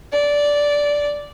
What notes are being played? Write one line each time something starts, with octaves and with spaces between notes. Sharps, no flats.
D5